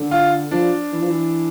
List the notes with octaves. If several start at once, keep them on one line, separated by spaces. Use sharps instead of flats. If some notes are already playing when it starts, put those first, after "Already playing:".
Already playing: D3
F4
F3 D4
E3
F3
E3